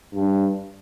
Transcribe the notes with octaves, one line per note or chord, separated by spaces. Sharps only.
G2